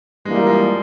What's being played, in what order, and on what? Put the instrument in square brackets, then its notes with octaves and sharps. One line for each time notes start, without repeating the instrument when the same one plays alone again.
[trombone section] G2 E3 A#3 [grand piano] G#3
[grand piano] G3
F3 G#3